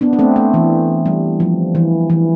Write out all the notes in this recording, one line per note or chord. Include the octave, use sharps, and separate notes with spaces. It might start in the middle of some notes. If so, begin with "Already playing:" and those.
B3 D4
D4
A3 C4
A3
E3
G3
F3
E3
E3